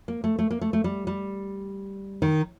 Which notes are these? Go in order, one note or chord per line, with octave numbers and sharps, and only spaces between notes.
A#3
A3
A3
A#3
A3
A3
G3
G3
D#3